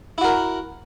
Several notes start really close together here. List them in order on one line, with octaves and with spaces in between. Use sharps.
E4 F#4 A#4